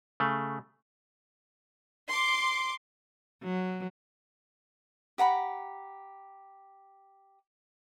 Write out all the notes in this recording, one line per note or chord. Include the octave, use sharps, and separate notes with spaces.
C#3 A3
C6 D6
F#3
G4 F#5 A#5 B5